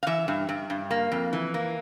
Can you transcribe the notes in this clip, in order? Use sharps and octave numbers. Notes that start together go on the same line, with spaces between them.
F5
E3 E5
G2
G2
G2
A#3
F2
E3
A#3